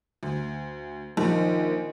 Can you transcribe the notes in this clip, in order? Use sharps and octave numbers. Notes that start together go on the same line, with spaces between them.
D2
A#1 D#3